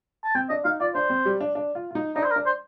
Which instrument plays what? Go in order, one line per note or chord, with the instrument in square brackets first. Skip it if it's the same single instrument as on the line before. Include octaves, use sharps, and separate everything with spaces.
[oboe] A5
[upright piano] C4 [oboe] G5
[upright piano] D4 [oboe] D#5
[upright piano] D#4 [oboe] F5
[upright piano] F4 [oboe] D5
[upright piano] D4 [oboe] C5
[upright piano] C4
G3
D4
D4
F4
F4
D#4
[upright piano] D4 [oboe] D#4
[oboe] C5
A#4
[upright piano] D4
[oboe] C5